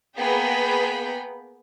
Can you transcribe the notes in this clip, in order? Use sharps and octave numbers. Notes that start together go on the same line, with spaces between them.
A#3 B3 G#4 G5 A#5 B5